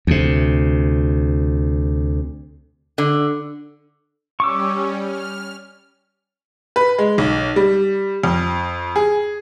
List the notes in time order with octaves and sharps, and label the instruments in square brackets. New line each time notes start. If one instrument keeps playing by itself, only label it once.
[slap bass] D2 C3
[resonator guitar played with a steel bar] D3
[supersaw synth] G3 C#4 [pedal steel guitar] C#6 D6 E6
[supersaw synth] F6
[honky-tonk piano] B4
G#3
B1
G3
F2
G#4